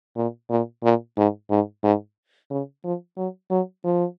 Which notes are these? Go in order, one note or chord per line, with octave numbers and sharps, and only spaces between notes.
A#2
A#2
A#2
G#2
G#2
G#2
C#3
F3
F#3
F#3
F3